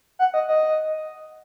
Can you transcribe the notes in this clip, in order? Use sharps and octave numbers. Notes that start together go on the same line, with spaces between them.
F#5
D#5
D#5